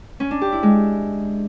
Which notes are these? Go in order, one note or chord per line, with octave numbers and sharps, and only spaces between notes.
C#4
D4
G4
E4
G#3